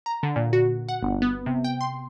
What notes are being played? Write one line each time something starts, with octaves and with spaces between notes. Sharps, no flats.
A#5
D3
A#2
F#4
F#5
G1
B3
C3
G5
C6